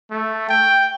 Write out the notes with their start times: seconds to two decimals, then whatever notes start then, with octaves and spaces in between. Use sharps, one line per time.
0.11 A3
0.49 G5